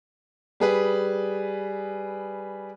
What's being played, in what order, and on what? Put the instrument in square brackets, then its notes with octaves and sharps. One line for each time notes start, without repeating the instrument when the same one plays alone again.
[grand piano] G3 G#4 B4